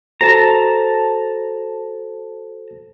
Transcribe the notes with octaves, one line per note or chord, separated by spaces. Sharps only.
F#4 A4 C5 A5 A#5